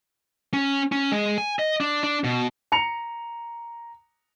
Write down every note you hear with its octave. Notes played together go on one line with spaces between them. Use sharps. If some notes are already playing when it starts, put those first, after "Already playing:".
C#4
C#4
G#3
G#5
D#5
D4
D4
B2
A#5 C#7 F7